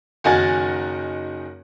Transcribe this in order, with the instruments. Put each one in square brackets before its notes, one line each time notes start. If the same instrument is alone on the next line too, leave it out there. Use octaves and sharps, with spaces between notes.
[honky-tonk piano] F#1 D#3 D#4 F#4 G#5 A6